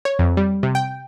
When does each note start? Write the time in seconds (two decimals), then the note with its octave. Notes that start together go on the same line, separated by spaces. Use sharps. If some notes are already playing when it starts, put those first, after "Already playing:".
0.05 C#5
0.19 F2
0.37 G3
0.63 C3
0.75 G5